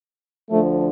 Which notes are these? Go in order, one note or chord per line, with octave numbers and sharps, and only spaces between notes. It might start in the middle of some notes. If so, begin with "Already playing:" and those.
D2 D3 F3 A3